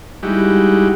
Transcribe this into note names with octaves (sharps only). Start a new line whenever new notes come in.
G3 G#3 D#4 E4 F#4 G4